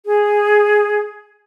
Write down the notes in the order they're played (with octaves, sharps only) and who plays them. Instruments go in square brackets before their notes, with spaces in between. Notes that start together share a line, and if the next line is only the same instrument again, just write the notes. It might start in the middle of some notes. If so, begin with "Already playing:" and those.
[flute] G#4